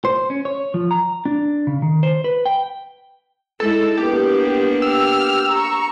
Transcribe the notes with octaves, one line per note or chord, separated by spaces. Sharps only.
C5
C#4
C#5
F3
A#5
D4
C#3
D#3
C5
B4
G5
G#3 D#4 E4 A4
A#3 B3 D4 G4
G4 E6 F6
A#5 C#6